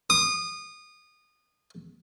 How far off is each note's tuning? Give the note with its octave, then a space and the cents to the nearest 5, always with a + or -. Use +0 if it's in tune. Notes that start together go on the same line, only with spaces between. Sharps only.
D#6 -25